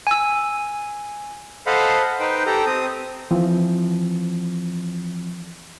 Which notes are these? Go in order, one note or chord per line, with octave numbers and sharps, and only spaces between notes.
G#5 E6
A4 C5 D#5 F5 F#5 B5
D#4 B4 C5 G5
G4 A4 A#5
C4 D#6
E3 F3 C4